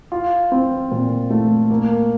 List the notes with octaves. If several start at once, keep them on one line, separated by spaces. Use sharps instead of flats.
F4
C4
A#2
A3
A#3